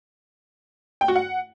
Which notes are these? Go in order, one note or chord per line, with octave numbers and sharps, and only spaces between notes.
G5
F#4
F#5